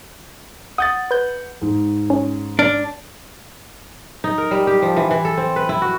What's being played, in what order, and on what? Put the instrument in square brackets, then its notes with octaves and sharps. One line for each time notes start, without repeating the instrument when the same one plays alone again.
[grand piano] F#5 [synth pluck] D#6 G6 A6
[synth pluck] B4 G6
[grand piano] G#2
[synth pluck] C#4
[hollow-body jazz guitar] D4 [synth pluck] F6
[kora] D#4
A#4
G3
G4
F3
E3
E3
A4
C4
B4
E4
F#4